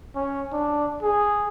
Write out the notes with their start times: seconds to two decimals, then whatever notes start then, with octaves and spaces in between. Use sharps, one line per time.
0.15 C#4
0.52 D4
1.03 G#4